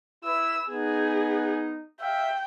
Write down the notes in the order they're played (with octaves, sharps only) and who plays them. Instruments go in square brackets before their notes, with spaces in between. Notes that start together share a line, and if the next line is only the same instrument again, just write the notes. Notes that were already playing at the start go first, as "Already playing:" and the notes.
[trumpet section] E4 B4 [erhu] E6
[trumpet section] B3 D#4 [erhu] G#4
[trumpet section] E5 F5 [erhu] G5